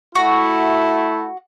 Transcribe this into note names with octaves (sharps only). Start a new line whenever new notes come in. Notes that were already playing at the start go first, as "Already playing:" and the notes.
A3 E4 F#4